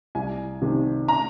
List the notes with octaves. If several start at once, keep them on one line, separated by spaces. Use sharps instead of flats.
C2 G#5
C3 D#3
A#5